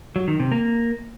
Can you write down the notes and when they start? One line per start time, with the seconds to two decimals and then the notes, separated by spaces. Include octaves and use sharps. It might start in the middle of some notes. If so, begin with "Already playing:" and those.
0.16 F#3
0.28 D#3
0.40 C3
0.52 A#3